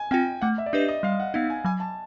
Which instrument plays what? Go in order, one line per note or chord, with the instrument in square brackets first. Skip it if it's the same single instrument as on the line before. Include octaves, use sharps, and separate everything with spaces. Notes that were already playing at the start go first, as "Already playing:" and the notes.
Already playing: [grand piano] G#5
[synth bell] C4 F4 [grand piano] G5
[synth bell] A3 [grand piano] F#5
[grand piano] E5
D5
[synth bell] D4 G4 B4 [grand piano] D#5
[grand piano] D#5
[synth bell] G3 [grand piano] F5
[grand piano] F#5
[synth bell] B3 D#4 [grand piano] F5
[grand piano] G#5
[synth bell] F#3 [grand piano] G#5
[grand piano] A5